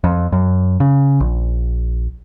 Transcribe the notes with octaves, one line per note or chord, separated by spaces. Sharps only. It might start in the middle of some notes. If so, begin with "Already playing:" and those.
F2
F#2
C#3
A#1